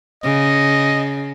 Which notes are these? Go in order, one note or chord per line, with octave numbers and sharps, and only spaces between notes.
C#3 D#5